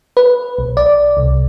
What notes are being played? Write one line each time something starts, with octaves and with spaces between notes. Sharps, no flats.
B4
B1
D5
C2